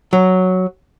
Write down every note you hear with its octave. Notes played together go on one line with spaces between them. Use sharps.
F#3